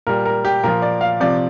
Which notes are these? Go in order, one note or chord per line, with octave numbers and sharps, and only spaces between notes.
A#2 G3 A#4
A#4
G4
A#2 F3 A#4
D5
F5
C3 F3 D5